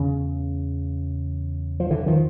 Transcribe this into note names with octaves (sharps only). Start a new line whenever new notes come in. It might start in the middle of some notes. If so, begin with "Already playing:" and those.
Already playing: E2 C#3
F3
D3 E3
D#3 F3